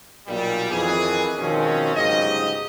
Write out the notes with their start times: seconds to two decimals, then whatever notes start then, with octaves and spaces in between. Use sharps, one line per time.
0.27 B1 A#2 G3
0.71 F2 D#3 E3 G#4
1.38 B2 D#3 F3 G#3 C4 C#4
1.95 G1 G#2 C#3 F#3 G4 D#5